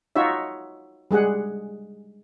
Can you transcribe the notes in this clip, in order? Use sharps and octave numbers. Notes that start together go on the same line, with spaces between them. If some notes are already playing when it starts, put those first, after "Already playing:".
D#4 F4 F#4 C#5 E5
G3 G#3 G#4 F#5